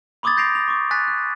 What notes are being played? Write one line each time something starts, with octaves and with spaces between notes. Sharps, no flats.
B5 C6 D6 D#6 G#6 A6
G6 A#6 C7 D7 F7
F7
C#6 D6
G#5 F#6 A6 B6 D#7
F#6